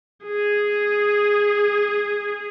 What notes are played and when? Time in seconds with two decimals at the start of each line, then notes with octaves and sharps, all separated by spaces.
0.25 G#4